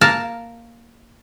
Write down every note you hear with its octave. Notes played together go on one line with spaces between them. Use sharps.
A#3 A#4 A5